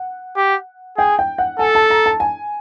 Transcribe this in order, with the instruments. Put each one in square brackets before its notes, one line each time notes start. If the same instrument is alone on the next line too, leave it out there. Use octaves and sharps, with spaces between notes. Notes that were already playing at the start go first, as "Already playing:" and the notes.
Already playing: [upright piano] F#5
[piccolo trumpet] G4
[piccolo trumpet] G#4 [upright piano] G5
[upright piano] G5
F#5
[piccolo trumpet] A4 [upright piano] G#5
[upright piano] A5
A#5
A5
G#5